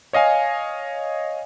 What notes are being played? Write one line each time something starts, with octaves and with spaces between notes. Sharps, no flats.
C#5 D#5 F5 G#5